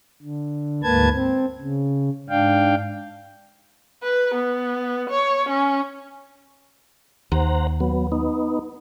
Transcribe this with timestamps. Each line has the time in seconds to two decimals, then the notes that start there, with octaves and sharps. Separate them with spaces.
0.22 D3
0.83 D2 G#2 A#3 B4 A5 G#6
1.13 C4
1.60 C#3
2.29 G#2 D4 F5 G5
4.03 B4
4.34 B3
5.10 C#5
5.49 C#4
7.32 D#2 C5 F#5 A#5
7.80 F#3 B3
8.12 B3 D#4